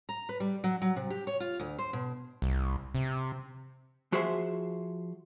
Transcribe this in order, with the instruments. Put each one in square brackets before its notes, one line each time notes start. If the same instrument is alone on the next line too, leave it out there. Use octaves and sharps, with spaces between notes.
[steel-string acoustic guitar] A#5
B4
G3
F#3
F#3
C3
G4
C#5
F4
D2
C5
B2
[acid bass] C2
C3
[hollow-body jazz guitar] F3 F#4 G#4 C5 E5 C6